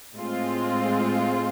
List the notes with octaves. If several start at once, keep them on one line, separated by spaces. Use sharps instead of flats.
A2 G#3 C4 F4